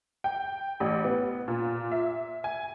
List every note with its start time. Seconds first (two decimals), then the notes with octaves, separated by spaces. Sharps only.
0.24 G5
0.80 A1
1.04 B3
1.48 A#2
1.92 E5
2.44 G#5